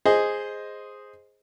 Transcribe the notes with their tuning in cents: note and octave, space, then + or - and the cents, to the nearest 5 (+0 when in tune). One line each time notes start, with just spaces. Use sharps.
G#4 +0 C5 +0 D#5 +0